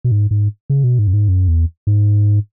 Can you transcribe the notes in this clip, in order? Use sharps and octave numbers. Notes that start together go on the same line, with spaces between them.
B2
G#2
G#2
C#3
B2
G#2
F#2
G#2
F#2
E2
G#2